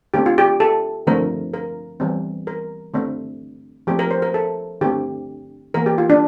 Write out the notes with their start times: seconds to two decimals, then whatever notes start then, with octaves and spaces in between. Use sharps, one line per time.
0.14 D3 A3 C4 G4
0.26 F4
0.38 G4
0.60 A4
1.07 D3 F3 A3 C4 A#4
1.54 A#4
2.00 E3 G3 C4
2.47 A#4
2.94 D3 A3 C4
3.87 F3 A3 C4 G4
3.99 A#4
4.11 C5
4.22 A#4
4.34 A4
4.81 D3 A3 C4 G4
5.74 E3 A#3 A#4
5.86 G4
5.98 F4
6.10 D4